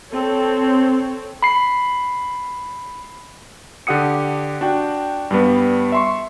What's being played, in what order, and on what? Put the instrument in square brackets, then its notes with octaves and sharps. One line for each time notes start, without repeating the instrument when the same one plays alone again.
[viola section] C4 A4 C#5
[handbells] B5 C7
[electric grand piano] D3 G4 F#5 D#6 C#7
D4 F#4 G5
G2 G3 B3
E5 C6 C#6